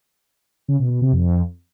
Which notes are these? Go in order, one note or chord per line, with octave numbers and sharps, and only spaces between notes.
C#3
B2
B2
C3
F2